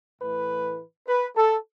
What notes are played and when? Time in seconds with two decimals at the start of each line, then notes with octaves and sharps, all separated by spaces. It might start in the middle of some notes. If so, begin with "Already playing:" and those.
0.22 A2 E3 A3 B4
1.08 B4
1.36 A4